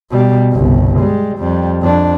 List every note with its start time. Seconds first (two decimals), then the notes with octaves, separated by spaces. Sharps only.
0.11 B2 G3
0.51 G1 C2
1.00 G3 G#3
1.39 F2 G3
1.81 F2 D4